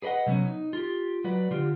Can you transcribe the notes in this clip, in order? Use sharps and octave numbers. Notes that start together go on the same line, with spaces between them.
G#4 B4 D5 D#5 F#5
C3 F#3 B3 C#4
D#4
F4 G4
F#3 F#4 B4 D5
D3 F4 G4